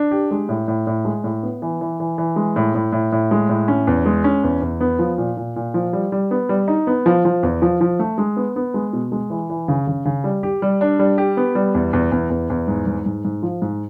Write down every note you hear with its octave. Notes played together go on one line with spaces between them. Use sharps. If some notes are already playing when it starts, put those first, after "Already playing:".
Already playing: D4
G4
G#3
A2
A2
A2
G#3
A2
B3
E3
E3
E3
E3
G#3
A2
A2
A2
A2
G#3
A2
C#4
E2
G#3
C#4
E2
E2
B3
F3
A#2
A#2
A#2
F3
G3
G3
B3
G3
D#4
B3
F3
F3
E2
F3
F3
A3
G#3
B3
B3
G#3
B2
G#3
E3
E3
C#3
C#3
C#3
G3
G4
G3
D4
G3
G4
B3
G3
E2
E2
E2
E2
E2
G#2
G#2
G#2
G#2
F3
G#2